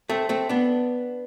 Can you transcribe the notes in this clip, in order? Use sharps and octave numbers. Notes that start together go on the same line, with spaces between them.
A3 C4
A3 C4
B3 D4